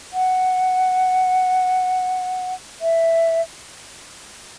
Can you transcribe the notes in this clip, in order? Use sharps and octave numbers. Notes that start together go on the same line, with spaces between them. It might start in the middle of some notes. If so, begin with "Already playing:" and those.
F#5
E5